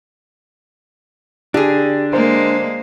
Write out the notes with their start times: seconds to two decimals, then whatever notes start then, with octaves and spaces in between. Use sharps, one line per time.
1.54 D3 D4 G4 G#4
2.13 G#3 A#3 C5